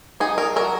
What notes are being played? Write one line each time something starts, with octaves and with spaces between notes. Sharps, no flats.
D#4 G#4
A#4
F#3 A#4